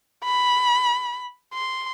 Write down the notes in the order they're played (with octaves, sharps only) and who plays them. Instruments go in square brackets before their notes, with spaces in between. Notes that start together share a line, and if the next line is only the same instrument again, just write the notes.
[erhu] B5
C6